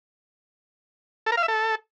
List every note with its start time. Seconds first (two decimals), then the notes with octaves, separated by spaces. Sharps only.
1.26 A4
1.32 A#4
1.37 F5
1.43 E5
1.48 A4